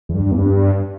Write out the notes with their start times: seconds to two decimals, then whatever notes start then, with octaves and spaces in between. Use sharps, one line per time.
0.09 E2
0.15 G2
0.31 E2
0.38 G2